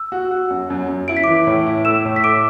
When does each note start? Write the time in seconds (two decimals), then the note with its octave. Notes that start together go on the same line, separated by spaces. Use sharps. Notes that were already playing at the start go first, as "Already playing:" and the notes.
Already playing: E6
0.12 F#4
0.31 F#4
0.50 F#2
0.70 F#2
0.89 F#2
1.08 E4 D7
1.17 B6
1.24 E3 D6 D7
1.47 A2
1.67 E4
1.85 A3 E6 E7
2.05 A2
2.16 B6
2.24 A3 D6 D7